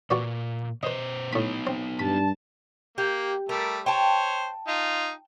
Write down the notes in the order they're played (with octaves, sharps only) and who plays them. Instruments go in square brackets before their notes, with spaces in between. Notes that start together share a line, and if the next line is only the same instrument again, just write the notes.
[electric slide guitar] A#2 [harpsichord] F#4 B4 D5
[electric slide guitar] B2 C5 [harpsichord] B4 D#5
[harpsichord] A2 B5 [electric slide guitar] B3 D#4
[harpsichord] C4
[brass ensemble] G2 A5 [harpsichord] B5
[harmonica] A#3 [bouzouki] G4
[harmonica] G3 A3 [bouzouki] A#4
[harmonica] C5 C#5 [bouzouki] G5 A5
[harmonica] D#4 F4